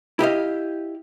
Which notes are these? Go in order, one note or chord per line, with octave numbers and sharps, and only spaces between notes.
E4 G4 D#5 F5